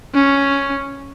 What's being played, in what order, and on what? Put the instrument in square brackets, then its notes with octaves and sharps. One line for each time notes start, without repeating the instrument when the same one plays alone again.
[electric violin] C#4